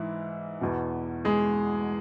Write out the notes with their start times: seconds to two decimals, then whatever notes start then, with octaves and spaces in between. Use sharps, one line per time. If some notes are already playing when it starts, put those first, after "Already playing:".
Already playing: G#2 E3 E4
0.61 E2 B2
1.25 G#3 G#4